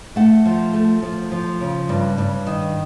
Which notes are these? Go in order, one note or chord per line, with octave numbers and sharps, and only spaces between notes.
A3 F#5
F3
A3
F3
F3
C#3
G2
G2
D#3